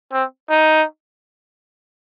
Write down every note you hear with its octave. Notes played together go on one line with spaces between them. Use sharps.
C4
D#4